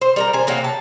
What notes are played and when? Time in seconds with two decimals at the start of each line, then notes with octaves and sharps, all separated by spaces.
0.01 C5
0.16 G3 A#4 A#5
0.33 C5 G#5
0.47 C3 F#3 A#3 G4
0.64 A5